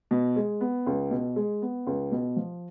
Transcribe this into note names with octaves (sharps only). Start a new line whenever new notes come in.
B2
G#3
B3
C#2
B2
G#3
B3
C#2
B2
F3